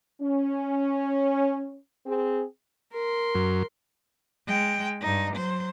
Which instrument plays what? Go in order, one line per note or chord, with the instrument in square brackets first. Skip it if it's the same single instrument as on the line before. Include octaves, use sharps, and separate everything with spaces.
[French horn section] C#4
C4 G#4
[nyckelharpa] A#4 C6
[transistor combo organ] F#2
[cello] G#3 G5
G2 D#4
F#3 C5